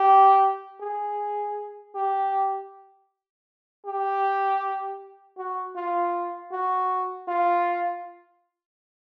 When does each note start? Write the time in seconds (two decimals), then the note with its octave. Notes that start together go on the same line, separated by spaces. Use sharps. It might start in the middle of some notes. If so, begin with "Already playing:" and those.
Already playing: G4
0.81 G#4
1.95 G4
3.86 G4
5.38 F#4
5.76 F4
6.52 F#4
7.28 F4